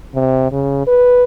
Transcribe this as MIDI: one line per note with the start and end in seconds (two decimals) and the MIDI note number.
0.15 0.50 48
0.52 0.86 49
0.87 1.24 71